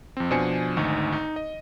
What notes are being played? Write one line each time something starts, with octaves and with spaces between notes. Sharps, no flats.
F2 C4
B2 F3 D4 C5 G#5 C#7
G#1 D2 D#4 C#6
D#4
D#5